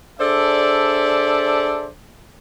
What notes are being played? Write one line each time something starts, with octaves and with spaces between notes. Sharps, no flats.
D4 G#4 A4 C5 D5 E5